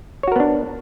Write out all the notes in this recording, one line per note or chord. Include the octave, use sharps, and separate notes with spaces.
B3 D4 F#4 A#4 C#5